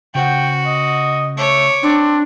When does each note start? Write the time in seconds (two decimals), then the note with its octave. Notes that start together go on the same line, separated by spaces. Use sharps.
0.15 C#3 F#4 C5 F#5 G5
0.66 D#5
1.37 A3 C#5 D6
1.83 C4 D4